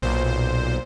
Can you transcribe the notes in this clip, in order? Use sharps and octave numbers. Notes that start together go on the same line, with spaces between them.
B1 A#2 C5